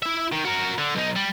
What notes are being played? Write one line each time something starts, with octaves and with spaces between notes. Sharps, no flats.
E4 E5
D#3
F#4 A#4
D3
B1 D#4
G3